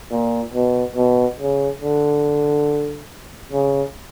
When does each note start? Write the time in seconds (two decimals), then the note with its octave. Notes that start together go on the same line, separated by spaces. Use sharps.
0.11 A#2
0.54 B2
0.96 B2
1.39 C#3
1.81 D3
3.53 C#3